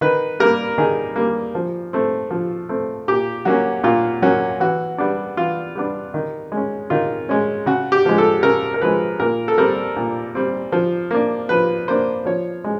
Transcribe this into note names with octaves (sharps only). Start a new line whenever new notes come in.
D#3 B4
G3 A#3 A#4
D#3 G#4
G3 A#3
F3
A3 C4
F3
A3 C4
A#2 G4
F#3 A#3 C#4 F#4
A#2 F4
F#3 A#3 C#4 F#4
E3 F#4
G3 B3 D4
E3 F4
G3 B3 D4
D#3
G#3 C#4
D#3 F4
G#3 C#4
C#3 F#4
G4
F3 G#3
A4
C#3 A#4
A#4
F3 G#3 B4
A#2 A#4
A4
G3 C4 A#4
A#2
G3 C4
F3
A#3 D4
F3 B4
A#3 D4 C5
F3 C#5
G#3